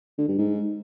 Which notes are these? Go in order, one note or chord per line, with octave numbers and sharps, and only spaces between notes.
D3
G2
G#2